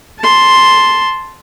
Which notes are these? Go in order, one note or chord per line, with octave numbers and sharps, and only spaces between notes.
A5 C6